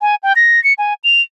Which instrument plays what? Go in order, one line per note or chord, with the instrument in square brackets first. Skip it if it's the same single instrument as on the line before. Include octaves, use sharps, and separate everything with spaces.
[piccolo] G#5
G5
A#6
C#7
G#5
F7